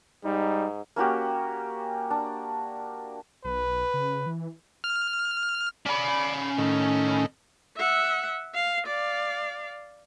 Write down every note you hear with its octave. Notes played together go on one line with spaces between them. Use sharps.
G#2 G3 D#4
A#3 C#4 F#4 G4
D4
B1 B4
C#3
E3
F6
C#4 D5 B5
A2 D#3
E5 F#5
F5
D5 F5